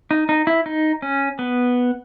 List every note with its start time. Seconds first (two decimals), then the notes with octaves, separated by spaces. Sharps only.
0.11 D#4
0.29 D#4
0.47 E4
0.66 D#4
1.02 C#4
1.39 B3